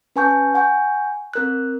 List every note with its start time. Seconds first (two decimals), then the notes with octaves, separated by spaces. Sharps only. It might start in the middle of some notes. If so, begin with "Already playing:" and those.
0.16 C#4 B4 G#5 A5 C#6 G6
0.54 F#5 G#5 C#6 G6
1.34 C4 A#4 F#6